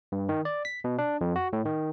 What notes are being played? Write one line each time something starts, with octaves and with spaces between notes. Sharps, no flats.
G2
D#3
D5
B6
B2
D4
F2
F#4
A2
D#3